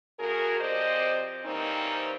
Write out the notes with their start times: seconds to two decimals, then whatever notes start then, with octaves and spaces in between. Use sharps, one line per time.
0.20 C#3 A3 F#4 G#4 A#4
0.61 C3 F3 C4 C5 D5 D#5
1.45 E3 G3 A#3 C4 C#4 D#4